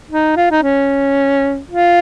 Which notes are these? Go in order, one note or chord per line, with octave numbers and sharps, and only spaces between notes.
D#4
F4
D#4
C#4
F4